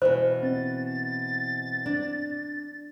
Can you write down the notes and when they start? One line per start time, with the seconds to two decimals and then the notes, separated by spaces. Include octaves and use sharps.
0.02 B2 E3 C5
0.43 C4 A6
1.86 D4